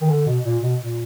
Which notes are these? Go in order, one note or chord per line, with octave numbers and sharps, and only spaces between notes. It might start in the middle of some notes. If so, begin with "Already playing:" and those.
D#3
D3
B2
A#2
B2
A#2